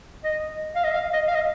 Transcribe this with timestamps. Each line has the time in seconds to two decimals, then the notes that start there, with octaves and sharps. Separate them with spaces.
0.24 D#5
0.76 F5
0.84 D#5
0.93 F5
1.13 D#5
1.28 F5
1.35 D#5